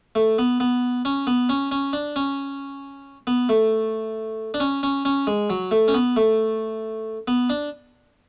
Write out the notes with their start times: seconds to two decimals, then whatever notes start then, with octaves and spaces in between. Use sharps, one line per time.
0.15 A3
0.38 B3
0.60 B3
1.05 C#4
1.27 B3
1.49 C#4
1.71 C#4
1.93 D4
2.16 C#4
3.27 B3
3.49 A3
4.54 D4
4.60 C#4
4.83 C#4
5.05 C#4
5.27 G#3
5.50 F#3
5.71 A3
5.88 C#4
5.94 B3
6.16 A3
7.28 B3
7.50 D4